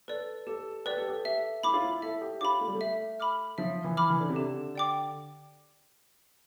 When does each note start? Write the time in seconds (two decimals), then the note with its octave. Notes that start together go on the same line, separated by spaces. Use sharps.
0.08 A4 B4 D5
0.47 G4 A4
0.86 G4 B4 D5
0.97 A4
1.08 G4
1.25 A4 E5
1.63 E4 B5 D6
1.74 F4
1.85 E4
2.02 A4 E5
2.21 G4
2.41 F4 B5 D6
2.61 A3
2.68 G3
2.75 A3
2.81 E5
3.20 B5 D6 F6
3.58 F3 E5
3.84 E3
3.97 B5 D6 F6
4.10 E3
4.20 D3
4.29 C3
4.36 D3 G4
4.75 D5 G5 D6